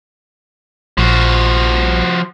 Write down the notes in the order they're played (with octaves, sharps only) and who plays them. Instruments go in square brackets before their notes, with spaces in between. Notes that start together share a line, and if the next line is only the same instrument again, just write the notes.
[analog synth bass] A#1 [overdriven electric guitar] F3 F#4